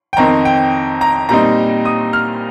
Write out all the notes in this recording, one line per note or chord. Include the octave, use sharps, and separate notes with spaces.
G5
F2 D#3 C4 D#4 A#5
G5
A#5
A#2 G3 C4 D#4 A#5
D#6
F6